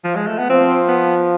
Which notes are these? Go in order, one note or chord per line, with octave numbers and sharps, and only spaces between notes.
F3
G#3
A3
B3
F3 C4
B3